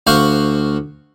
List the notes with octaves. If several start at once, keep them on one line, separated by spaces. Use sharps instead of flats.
D2 C5 F5 F#5 C#6